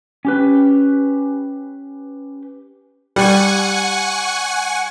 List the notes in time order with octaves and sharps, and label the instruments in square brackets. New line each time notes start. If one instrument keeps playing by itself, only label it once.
[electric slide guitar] C#4 G4 B4
[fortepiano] G3 [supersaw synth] F#5 G#5 C#6